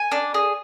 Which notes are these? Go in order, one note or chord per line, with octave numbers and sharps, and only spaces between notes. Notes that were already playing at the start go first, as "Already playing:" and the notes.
Already playing: G#5
D4
G#4